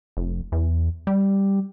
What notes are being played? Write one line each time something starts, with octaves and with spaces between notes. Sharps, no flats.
F1
E2
G3